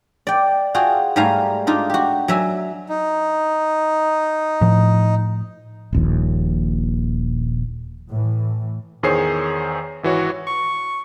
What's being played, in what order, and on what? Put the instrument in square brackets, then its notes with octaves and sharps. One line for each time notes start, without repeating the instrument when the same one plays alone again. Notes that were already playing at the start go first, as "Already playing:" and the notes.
[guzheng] D5 G5
F4 F#4 G#4 G5
G#2 G3 A3 F5 G#5 A#5
D4 D#4 F4
F#4 G4
F#3 E5 G#5
[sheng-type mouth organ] D#4
[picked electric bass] A2 F3
[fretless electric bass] D#1 A#1 D#2
[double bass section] A2 E3
[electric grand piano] E2 D#3 G#4 C5 C#5 C7
G#1 E3 F#4 C#5
[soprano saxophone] C#6